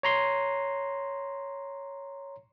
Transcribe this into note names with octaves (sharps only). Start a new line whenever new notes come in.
C#5 A#5 C6